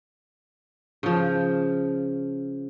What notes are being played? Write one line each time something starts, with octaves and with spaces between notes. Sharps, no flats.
C#3 F3